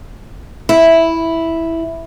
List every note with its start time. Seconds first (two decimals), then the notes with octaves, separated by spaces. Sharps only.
0.69 E4